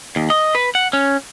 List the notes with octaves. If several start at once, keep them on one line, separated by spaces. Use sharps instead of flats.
D#2
D#5
B4
F#5
C#4